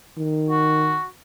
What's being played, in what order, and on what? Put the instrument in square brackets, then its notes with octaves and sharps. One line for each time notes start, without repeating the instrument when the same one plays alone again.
[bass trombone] D#3
[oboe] F#4